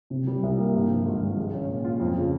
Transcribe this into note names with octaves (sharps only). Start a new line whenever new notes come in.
C3
G3
C2
A#3
G2
F3
G#1
G#1
G#3
C#4
A#2
F4
F2
C#3